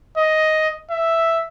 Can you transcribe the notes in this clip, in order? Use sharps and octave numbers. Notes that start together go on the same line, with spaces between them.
D#5
E5